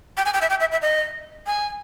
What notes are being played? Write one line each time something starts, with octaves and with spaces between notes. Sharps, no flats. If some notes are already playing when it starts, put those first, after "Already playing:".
G5
G#5
G5
E5
G5
E5
E5
D#5
G#5